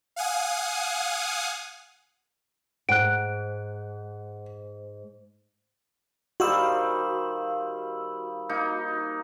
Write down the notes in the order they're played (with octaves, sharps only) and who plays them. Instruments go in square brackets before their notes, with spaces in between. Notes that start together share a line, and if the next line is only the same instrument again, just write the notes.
[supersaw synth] F5 F#5 G#5 D#6
[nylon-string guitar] G#2 [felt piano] F#5 [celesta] F#6 D7
[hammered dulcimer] D#3 G3 C5 [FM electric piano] F#4 F5 E6
[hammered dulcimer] A#3 D#4